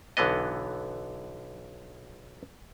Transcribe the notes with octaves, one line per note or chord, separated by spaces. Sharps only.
B1 D3 E3 B3 D#5